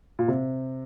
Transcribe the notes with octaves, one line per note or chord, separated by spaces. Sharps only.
A#2
C3